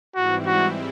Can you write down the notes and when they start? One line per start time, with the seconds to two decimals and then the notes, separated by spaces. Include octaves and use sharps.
0.15 G#2 E3 G3 C4 E4 F#4
0.46 F#4